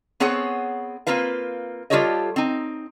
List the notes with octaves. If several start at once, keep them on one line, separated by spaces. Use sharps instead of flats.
B3 C4 G#4 C#5 F#5
A#3 C4 F4 B4 F5
G3 F4 G4 A4 C#5 D#5
C4 D#4